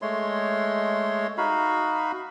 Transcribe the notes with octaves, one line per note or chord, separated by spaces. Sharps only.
G#3 A3 C#5 C6
D#4 F#4 F5 B5